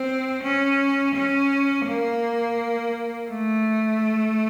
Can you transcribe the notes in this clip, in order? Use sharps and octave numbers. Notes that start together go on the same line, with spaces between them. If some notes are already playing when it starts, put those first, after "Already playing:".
Already playing: C4
C#4
C#4
A#3
A3